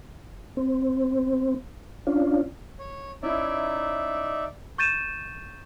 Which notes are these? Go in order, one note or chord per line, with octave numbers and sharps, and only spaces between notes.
C4
C#4 D4 F4
C#5
C#4 D#4 E4 D5 E5
C#6 G6 A6 D#7 E7